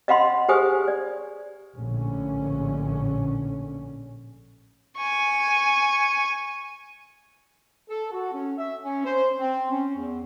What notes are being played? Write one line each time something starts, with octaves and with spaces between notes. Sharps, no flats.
D#5 F5 F#5 B5 C6
G4 G#4 B4 C5 G#5 D#6
D5
A#1 A2 D3 C#4
G#5 C#6
A4
F#4
C#4
E5
C#4
C5
C4
C#4
E2